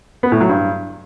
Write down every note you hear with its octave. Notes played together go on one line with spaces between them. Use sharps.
B3
A2
F#3
G2